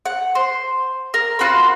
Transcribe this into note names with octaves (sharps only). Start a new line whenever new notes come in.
F#5
C5
A#4
F4 F#4 C5 B5